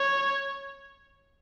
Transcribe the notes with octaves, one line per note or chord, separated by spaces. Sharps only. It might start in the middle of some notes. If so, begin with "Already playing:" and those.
Already playing: C#5